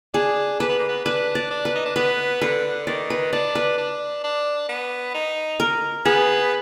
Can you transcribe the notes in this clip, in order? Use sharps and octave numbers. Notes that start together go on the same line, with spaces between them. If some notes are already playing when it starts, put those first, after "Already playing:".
D4 G#4
D4 B4
B3
A#3
B3
D4 B4
D5
D4
B4
D#4
D4
B3 B4
D3 B4
D#3 D5
B4
D4 D5
B4
D4
D4
B3
D#4
A#4
B3 G#4